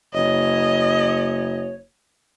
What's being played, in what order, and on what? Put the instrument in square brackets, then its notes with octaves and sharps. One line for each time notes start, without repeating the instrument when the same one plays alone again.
[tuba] F#1 [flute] C#5 [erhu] D#5